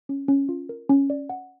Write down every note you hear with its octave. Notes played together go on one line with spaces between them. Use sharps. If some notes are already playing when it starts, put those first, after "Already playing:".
C#4
C#4
F4
A#4
C#4
D5
F#5